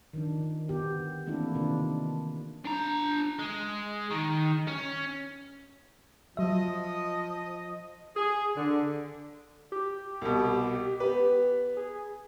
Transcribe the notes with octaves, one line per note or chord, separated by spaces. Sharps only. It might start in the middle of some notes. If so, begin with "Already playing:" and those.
D#3 F3 D4
D3 B3 G4
E3 A3 A#3 C4 D4 E4
C3 D#3 D4 F4
D4 A#5
G#3
D#3
C#4
F3 F#3 D#5 E5
G#4
D3
G4
C2 B2
B3 B4
G#4